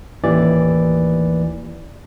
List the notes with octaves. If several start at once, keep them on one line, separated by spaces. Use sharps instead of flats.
A1 D#2 E3 D5